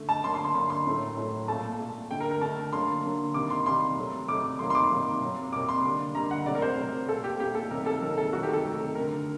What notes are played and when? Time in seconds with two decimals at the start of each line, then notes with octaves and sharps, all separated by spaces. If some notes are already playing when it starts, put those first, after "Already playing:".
Already playing: D3 A3
0.09 A5
0.24 D3 F#3 A#3 C6
0.34 C6
0.44 C6
0.54 D3 F#3 A#3 C6
0.70 C6
0.86 A2 F#3 A3
1.17 A2 F#3 A3
1.48 A#2 A3 A5
1.80 A#2 A3
2.11 D3 A3 G5
2.20 A#4
2.31 A#4
2.42 D3 A3 A5
2.73 D3 F#3 A#3 C6
3.04 D3 F#3 A#3
3.34 C3 D#3 G3 A#3 D6
3.50 C6
3.66 C3 D#3 G3 A#3 C6
3.97 C3 F#3 A3
4.28 C3 F#3 A3 D6
4.59 C3 D#3 F#3 A#3 C6
4.70 C6
4.75 D6
4.91 C3 D#3 F#3 A#3
5.22 C3 F#3 A#3
5.52 C3 F#3 A#3 D6
5.69 C6
5.84 D3 G3 A#3
6.15 D3 G3 A#3 A#5
6.31 F#5
6.46 C3 F#3 A3 D5
6.55 A#4
6.62 C5
6.77 C3 F#3 A3
7.09 A#2 A3 A4
7.24 G4
7.40 A#2 G4
7.44 A3
7.55 A4
7.71 C3 D#3 F#3 A#3 A#4
7.86 A4
8.02 C3 D#3 F#3 A#3 A#4
8.18 A4
8.33 C3 D#3 F#3 A3 F#4
8.43 G4
8.53 A4
8.64 C3 D#3 F#3 A3
8.95 D3 A3 A#4